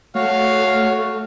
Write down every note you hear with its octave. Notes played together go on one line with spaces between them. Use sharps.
A3 F#4 C#5 F5